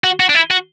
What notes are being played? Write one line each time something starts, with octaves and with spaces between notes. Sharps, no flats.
F#4
F#4
D4
E4
F#4